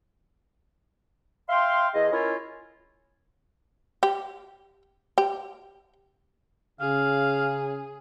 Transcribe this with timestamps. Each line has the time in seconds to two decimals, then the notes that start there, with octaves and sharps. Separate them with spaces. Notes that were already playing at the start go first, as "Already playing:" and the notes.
1.49 E5 F5 G5 C6
1.94 E2 G#4 D#5
2.13 C#4 E4 F4 A#4
4.03 G4
5.18 G4
6.80 C#3 G#4 F5